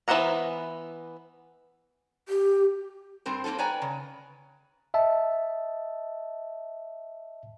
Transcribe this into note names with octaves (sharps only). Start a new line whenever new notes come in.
E3 B3 C5 F#5 A#5
G4
G2 C4 A#4 C5
A#3 C4 C#4 F4 A4
B4 C#5 D5 G5 G#5 A#5
C#3
D#5 E5 A5